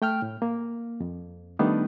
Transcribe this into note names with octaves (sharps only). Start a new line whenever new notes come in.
A3 G5 F6
A2
A#3
F2
D#3 G3 A3 B3 D4 D#4